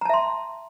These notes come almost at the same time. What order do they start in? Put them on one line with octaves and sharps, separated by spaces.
A#5 A5 E5 C6